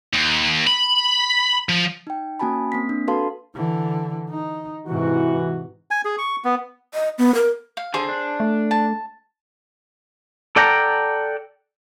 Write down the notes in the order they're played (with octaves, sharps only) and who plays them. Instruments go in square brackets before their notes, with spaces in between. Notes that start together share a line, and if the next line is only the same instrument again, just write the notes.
[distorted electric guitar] D#2
B5
F3
[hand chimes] D#4 G5
A#3 C#4 F#4 G#5 A5 B5
A#3 C4 B6
D4
F#4 A4 B4 F5 A5 C6
[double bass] D3 E3
D#4
[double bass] G#2 C3 [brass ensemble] E3 F#4
[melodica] G#5
G#4
C#6
B3
[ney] D#5
B3
A#4
[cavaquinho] F5
[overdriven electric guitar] D3 [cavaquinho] G#4 C5
[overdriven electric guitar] D4
[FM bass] A3
[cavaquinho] A5
[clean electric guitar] A4 D5 F#5 G5 A5 A#5